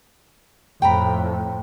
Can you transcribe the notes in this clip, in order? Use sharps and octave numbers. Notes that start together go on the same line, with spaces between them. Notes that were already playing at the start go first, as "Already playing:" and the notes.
F2 A2 G5 A#5 B5